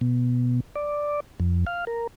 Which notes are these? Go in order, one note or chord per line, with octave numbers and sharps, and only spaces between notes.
B2
D5
F2
F5
A#4